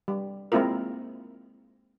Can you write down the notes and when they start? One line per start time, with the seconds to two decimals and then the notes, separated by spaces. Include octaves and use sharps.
0.08 G3
0.52 G#3 A#3 C4 E4 F4 A#4